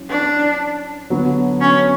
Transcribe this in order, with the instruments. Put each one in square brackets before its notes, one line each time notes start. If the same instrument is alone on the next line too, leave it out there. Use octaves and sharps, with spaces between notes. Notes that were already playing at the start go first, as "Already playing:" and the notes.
Already playing: [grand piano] F#3 C#4 E4
[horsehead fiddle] D4
[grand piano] D3 F#3 B3
[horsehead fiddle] C#4